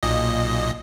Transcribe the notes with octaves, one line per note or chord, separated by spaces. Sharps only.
B1 A#2 D#5